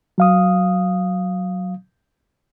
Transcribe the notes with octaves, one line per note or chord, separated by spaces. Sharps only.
F#3 F5 D#6